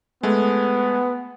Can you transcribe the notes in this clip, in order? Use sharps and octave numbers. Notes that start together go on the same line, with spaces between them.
G#3 A3 B3